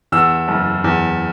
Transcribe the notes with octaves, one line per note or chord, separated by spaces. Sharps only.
E2 E6
F#1
E2